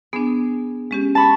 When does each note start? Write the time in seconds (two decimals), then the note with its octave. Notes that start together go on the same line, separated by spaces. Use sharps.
0.13 B3 D4 G#4
0.91 G#3 C#4 G4
1.15 A5 B5 C#6